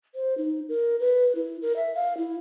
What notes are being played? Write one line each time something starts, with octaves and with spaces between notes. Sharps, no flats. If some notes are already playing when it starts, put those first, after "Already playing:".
C5
D#4
A#4
B4
E4
A#4
E5
F5
E4